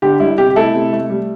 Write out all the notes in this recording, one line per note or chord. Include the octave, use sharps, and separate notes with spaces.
D3 G4
G3 E4
C3 G4
G4
A3 E4 A4
C3
A3
G3